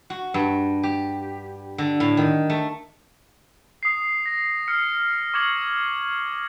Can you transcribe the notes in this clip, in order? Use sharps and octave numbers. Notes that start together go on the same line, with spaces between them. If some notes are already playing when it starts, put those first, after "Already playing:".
F#4
G2
G4
D3
A2
D#3
A3
D#6 C7
A#6
F6 C#7
C#6 D6 G#6 C#7 F#7